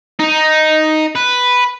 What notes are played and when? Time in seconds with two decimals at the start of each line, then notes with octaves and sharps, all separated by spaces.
0.20 D#4
1.16 B4